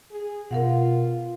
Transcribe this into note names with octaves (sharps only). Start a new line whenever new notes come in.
G#4
B2 F4 A#4 F5 F#5